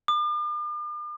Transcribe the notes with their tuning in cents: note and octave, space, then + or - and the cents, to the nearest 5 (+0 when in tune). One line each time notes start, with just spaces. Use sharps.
D6 +45